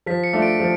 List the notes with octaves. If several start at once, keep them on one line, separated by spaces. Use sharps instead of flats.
F3 B6
C#7
A3 D4 F4
D7
F3